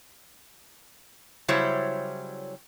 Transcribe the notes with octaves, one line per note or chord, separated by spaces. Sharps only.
C#3 F#3 G3 E4 C5 C#5